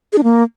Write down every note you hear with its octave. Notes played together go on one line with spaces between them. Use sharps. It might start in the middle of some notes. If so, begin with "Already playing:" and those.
G#4
D4
A#3